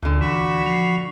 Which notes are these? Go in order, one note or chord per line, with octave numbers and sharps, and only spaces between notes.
D2 A#2 D3
E3 F#4 B5 C#6
F3